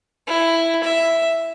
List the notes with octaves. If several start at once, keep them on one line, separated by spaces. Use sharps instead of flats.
E4
E5